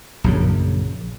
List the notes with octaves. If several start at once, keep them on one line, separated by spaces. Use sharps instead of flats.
A#1 F#2 C#3